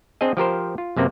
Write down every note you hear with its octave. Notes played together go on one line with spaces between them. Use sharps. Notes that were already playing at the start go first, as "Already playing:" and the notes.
C4 D4 G#4 D#5
F3 G4 A#4 C5
F4
F#2 C3 A#3 C4